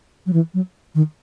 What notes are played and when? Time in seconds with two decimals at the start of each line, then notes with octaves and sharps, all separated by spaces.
0.26 F#3
0.33 E3
0.54 F#3
0.95 D#3